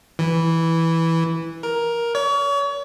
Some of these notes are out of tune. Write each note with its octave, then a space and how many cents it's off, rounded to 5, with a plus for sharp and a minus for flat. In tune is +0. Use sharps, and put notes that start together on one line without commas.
E3 -5
A#4 +10
C#5 +35